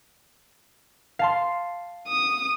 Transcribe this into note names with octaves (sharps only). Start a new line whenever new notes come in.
F5 A5 C6
D#6